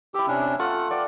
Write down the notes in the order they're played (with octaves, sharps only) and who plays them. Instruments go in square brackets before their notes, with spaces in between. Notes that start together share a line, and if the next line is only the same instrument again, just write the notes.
[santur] E4 E6 [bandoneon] G4
[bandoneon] C3 C#4 D4 [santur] G5
[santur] A3 F4 [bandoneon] F#5
[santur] D5 F#5 G5